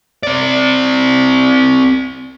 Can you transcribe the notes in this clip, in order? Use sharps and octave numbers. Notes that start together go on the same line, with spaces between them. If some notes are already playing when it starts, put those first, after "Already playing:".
C4 D5